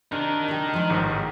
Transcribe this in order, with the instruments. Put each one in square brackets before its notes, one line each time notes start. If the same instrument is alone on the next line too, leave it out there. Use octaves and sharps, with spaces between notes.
[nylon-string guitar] C3 [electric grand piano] D4 [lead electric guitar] D#4 A#4
[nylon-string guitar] D#3 G4
F3 G#3
[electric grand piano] A1 G#2 D#3